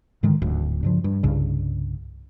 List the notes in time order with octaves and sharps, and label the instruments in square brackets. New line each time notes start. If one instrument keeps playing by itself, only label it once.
[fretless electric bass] G#2 D3 D#3 G#3
D1 D2 G#2
G2 C#3 F3
G2
C2 G2 C#3